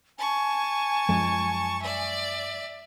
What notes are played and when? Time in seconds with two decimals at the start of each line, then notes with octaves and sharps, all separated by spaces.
0.18 G#5 A5 C#6
1.09 F#2 F3 G#3
1.82 D5 E5